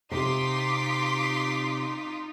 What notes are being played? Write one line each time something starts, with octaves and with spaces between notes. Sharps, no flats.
C3 D#4 F4 C6 D6 B6